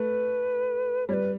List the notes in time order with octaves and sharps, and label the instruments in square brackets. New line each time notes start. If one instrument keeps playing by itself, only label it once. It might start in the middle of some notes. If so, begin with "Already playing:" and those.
Already playing: [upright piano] A3 [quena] B4
[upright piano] G3 [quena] B4 C#5